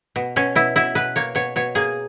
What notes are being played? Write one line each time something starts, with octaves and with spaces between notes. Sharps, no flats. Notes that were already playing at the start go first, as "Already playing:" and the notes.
B2
B2 C#4
B2 E4
B2 E4
B2 B4
A#3 C#5
B2 C#5
B2 C#5
A#3 G#4